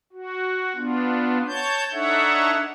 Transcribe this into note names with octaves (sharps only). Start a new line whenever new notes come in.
F#4
B3 D4 F4
C#5 A5 G6
D4 D#4 A4 C#5 E5 F#5